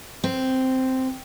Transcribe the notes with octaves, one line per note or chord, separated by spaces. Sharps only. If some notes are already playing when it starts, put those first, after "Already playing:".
C4